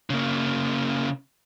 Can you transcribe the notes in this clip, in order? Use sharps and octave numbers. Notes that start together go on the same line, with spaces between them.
C#3 A#3